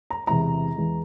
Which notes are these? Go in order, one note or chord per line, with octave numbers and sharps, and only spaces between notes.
A#5
E2 C3 E3 G#3 E4 A#5
E2 E3 G#3